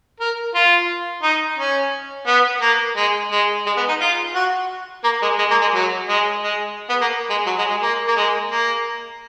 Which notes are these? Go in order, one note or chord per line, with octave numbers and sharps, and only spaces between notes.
A#4
F4
D#4
C#4
B3
A#3
G#3
G#3
G#3
B3
D#4
F4
F#4
A#3
G#3
G#3
A#3
G#3
F#3
G#3
G#3
B3
A#3
G#3
F#3
G#3
G#3
A#3
A#3
G#3
A#3